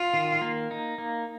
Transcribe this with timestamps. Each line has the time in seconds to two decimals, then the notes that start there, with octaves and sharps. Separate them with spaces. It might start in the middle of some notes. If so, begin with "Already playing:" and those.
Already playing: F4
0.14 D#3
0.41 A#3
0.71 D#4
0.98 A#3